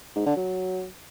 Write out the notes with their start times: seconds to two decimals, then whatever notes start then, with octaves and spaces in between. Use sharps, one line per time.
0.16 G#2
0.26 D3
0.36 F#3